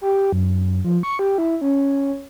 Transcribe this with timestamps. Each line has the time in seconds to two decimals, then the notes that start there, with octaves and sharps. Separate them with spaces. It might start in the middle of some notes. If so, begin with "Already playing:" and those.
0.01 G4
0.33 F#2
0.85 F3
1.03 C#6
1.19 G4
1.38 E4
1.61 C#4